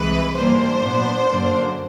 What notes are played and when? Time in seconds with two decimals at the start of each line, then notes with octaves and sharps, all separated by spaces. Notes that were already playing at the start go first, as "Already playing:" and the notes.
Already playing: C2 C3 E3 G#3 B4
0.35 G#2 E3 G3 A#3 D4 C5
0.82 A#2 F#3 B3 D4
1.26 F#2 D3 F#3 A#3 D4